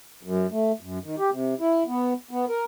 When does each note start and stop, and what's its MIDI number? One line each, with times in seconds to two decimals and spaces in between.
0.23 0.47 42
0.52 0.72 57
0.81 0.98 42
1.04 1.16 51
1.19 1.30 67
1.31 1.54 48
1.60 1.83 64
1.87 2.13 59
2.31 2.45 59
2.49 2.65 70